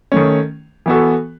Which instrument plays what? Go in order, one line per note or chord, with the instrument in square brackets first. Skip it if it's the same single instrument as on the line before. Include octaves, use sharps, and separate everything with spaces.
[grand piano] D#3 A3 C#4
E3 B3 F#4 A4